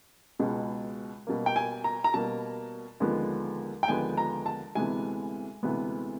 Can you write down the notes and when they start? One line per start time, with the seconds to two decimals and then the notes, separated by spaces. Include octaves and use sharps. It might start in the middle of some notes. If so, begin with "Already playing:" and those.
0.39 C#2 B2 G#3
1.27 B2 G3 A#3
1.46 G5
1.56 G#5
1.84 A#5
2.04 A#5
2.14 B2 G3 A#3 A5
3.00 D#2 D3 F3 G#3 B3
3.83 G5
3.88 D#2 D3 F3 G#3 B3 G#5
4.17 A#5
4.46 A5
4.75 D2 C3 E3 G#3 B3 G#5
5.63 D2 C3 E3 G#3 B3